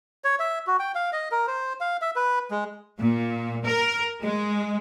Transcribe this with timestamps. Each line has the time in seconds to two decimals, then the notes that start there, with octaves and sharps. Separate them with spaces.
0.24 C#5
0.40 E5
0.67 F#4
0.79 G5
0.95 F5
1.13 D#5
1.31 A#4
1.48 C5
1.81 F5
2.02 E5
2.16 B4
2.51 G#3
2.99 A#2
3.66 A#4
4.22 G#3